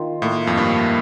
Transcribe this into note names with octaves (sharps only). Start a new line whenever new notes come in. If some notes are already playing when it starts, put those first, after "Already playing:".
Already playing: D#3 F4
A2 A#3
F2
G2 A4